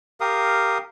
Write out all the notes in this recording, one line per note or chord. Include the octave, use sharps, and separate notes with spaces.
G4 A#4 F5 D#6